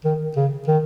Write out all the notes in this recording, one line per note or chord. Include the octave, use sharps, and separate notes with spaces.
D#3
C#3
D#3